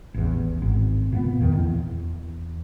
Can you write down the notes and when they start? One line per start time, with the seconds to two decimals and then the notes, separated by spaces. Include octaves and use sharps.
0.14 A1 E2
0.62 G#1
1.12 A#2 A#3 B3
1.41 E2 D#3
1.52 E2